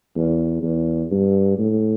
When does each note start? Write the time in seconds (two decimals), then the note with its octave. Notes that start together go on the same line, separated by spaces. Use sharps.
0.16 E2
0.62 E2
1.11 G2
1.59 A2